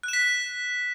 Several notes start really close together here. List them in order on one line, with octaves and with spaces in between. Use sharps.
F#6 E7 B6